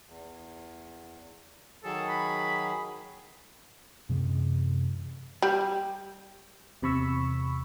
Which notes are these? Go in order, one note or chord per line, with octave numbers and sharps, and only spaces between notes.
E2
D#3 F#3 G#4 A4
B5
F#2 C3 E3 G#3
G3
E2 C3 B5 C#6 E6